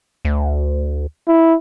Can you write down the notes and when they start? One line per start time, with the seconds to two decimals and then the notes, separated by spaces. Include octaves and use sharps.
0.25 D2
1.28 E4